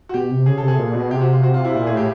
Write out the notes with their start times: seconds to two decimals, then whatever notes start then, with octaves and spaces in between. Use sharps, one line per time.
0.09 F#4
0.14 B2 G4
0.31 C3
0.46 C#3 G#4
0.58 A4
0.63 C3
0.68 G#4
0.79 A#2
0.95 B2
1.11 C3 G4
1.21 F#4
1.32 F4
1.43 F#4
1.54 F4
1.65 E4
1.75 A#2 F4
1.86 A2 G#4
1.97 G4